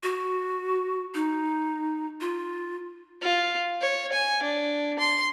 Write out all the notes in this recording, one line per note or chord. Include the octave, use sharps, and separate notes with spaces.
F#4
D#4
F4
F4
C#5
G#5
D4
C6